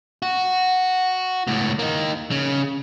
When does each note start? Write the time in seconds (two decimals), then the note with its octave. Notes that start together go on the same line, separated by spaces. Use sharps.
0.22 F#4
1.47 C#2 A2
1.79 A#3 D#4
2.31 C#3